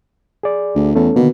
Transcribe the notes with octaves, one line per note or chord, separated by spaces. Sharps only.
G#4 D5
D2
E2 A3 C#4 A4
B2 D3 D#3 A#3